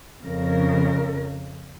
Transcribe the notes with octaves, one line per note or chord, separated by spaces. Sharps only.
F2 C#3 A#4